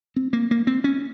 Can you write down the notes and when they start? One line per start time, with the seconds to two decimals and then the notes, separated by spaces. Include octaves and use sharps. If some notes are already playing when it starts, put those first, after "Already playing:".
0.16 C4
0.33 A#3
0.51 A#3
0.67 C4
0.84 C#4